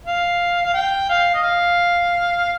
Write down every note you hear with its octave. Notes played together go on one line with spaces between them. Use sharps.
F5
F5
G5
F5
D#5
F5